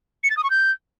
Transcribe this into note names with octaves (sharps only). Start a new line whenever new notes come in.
C#7
A6
D#6
C#6
G6